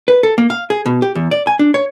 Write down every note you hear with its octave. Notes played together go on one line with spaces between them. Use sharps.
B4
A4
A#3
F5
G#4
B2
G4
E2
D5
G#5
D4
C#5